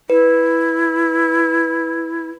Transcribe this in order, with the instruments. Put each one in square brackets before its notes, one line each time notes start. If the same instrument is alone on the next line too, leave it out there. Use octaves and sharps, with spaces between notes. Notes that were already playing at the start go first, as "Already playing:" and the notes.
[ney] E4 [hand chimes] B4